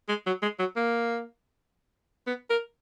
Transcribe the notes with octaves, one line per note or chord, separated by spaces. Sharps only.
G#3
F#3
G#3
F#3
A#3
B3
A#4